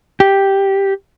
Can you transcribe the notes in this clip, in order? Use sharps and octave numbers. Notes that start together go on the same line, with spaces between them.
G4